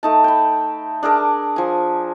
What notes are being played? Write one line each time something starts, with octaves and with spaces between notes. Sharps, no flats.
A3 D#4 A5
G5 B5
D4 G#4 A#4 D5
F3 G#5